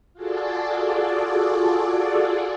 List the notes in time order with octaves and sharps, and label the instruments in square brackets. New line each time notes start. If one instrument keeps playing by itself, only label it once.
[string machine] F4 F#4 G#4 A4 D5